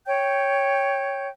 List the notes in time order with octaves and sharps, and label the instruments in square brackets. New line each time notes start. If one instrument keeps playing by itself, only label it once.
[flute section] C#5 G5 G6